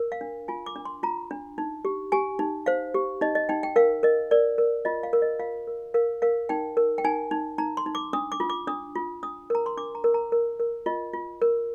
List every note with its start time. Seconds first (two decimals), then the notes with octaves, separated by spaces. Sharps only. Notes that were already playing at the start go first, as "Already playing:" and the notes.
Already playing: A#4
0.12 F5
0.21 D4
0.48 F4 G#5
0.66 D6
0.76 D4
0.85 C6
1.03 F4 A#5
1.31 D4
1.58 D#4
1.85 G4
2.12 G4 G#5
2.39 D#4
2.66 C5 F5
2.94 G4
3.21 D#4 D#5
3.35 D#5
3.49 D#4 G5
3.63 G5
3.76 A#4 F5
4.03 A#4 D#5
4.31 A#4 D5
4.58 A#4
4.85 F4 D#5
5.03 F5
5.13 A#4
5.22 D#5
5.40 F4 F5
5.67 A#4
5.94 A#4 F5
6.22 A#4 F5
6.49 D#4 G5
6.77 A#4
6.98 G5
7.04 D#4 G#5
7.31 D#4
7.58 D#4 A#5
7.77 C6
7.86 D#4
7.95 D6
8.13 D4 D#6
8.32 D6
8.40 F4
8.50 D6
8.67 D4 D#6
8.95 F4
9.23 D4 D#6
9.50 A#4 A#5
9.66 C6
9.77 D4 D6
9.95 A#5
10.04 A#4
10.14 A#5
10.32 A#4
10.60 A#4
10.86 F4 D#5
11.13 F4
11.42 A#4